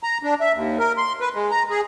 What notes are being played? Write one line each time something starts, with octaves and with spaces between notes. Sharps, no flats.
A#5
D4
E5
D#2
A#4
C6
B4
G#3
A#5
G#4